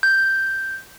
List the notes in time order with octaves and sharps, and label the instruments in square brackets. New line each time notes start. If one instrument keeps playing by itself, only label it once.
[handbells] G6